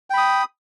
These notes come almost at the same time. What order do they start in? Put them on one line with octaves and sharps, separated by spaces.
G5 B5 D#6